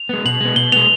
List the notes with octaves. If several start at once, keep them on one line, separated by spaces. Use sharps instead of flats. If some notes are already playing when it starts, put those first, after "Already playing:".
Already playing: F7
G#3 B3
B2 F#7
G#3 B3
B2 G7
G#3 B3 F7